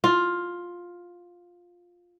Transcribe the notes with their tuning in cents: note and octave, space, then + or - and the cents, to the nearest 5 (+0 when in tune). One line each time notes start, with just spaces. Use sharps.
F4 +10